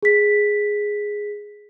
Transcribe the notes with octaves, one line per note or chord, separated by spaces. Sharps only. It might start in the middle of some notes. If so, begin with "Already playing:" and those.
G#4 B6